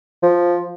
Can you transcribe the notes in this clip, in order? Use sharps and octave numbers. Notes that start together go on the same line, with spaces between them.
F3